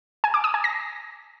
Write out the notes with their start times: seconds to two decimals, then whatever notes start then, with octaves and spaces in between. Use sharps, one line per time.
0.24 G#5
0.34 D6
0.44 D#6
0.54 G#5
0.64 A#6